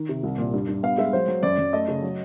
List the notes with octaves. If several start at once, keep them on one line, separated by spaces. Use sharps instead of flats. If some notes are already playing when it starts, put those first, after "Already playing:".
Already playing: D#3
C3
C2
A#2
G2
G2
B3 F5
G#3 E5
F#3 C5
F#3
F#2 D5
F#2
A3 D#5
C#3
F#3